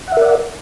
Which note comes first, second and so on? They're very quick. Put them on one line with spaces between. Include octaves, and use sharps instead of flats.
F#5 E5 A#4 D5